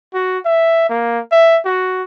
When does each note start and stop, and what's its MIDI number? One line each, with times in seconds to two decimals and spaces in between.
0.14 0.39 66
0.45 0.86 76
0.89 1.20 58
1.32 1.59 76
1.65 2.03 66